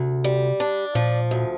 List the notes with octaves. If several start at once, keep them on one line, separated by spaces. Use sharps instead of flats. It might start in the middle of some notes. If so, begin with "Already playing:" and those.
Already playing: D2 C3
G3
D4
A#2 F3
D2